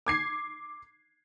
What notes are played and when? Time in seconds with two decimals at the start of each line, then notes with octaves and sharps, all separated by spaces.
0.06 D6 G#6 C7